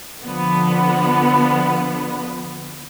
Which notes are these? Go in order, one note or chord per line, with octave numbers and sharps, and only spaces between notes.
D3 F3 B3